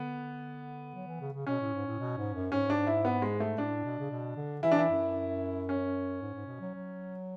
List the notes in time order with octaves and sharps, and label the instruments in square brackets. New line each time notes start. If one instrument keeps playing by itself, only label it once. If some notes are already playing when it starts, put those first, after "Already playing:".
Already playing: [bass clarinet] D3 [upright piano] B3
[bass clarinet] F#3
E3
C#3
C#3
[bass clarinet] B2 [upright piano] C#4
[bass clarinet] A2
G#2
A2
B2
G#2
F#2
[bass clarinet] G#2 [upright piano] C#4
[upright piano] D4
E4
B3
G#3
A3
[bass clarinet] A2 [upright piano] D4
[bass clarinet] B2
C#3
B2
D3
[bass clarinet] E3 [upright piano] E4
[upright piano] D4
E4
[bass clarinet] F#2
[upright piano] C#4
[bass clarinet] G#2
G#2
B2
F#3
F#3